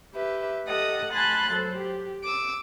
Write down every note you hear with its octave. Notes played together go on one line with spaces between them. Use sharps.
G4 B4 E5
G4 A4 D#5 F#5 D#6
G#5 A5 B5 C6 F#6 A6
F#3 A4 C5
G4
D6 E6